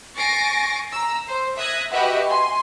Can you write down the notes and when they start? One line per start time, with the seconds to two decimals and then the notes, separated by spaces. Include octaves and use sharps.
0.16 G#5 C#6 A6 A#6 C7 D7
0.91 A#5 E6
1.27 C5
1.58 E5 D#6 F#6 G#6 A#6
1.91 F#4 G4 B4 D#5 E5 F#5
2.29 G#5 C6